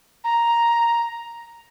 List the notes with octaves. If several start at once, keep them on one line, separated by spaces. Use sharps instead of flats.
A#5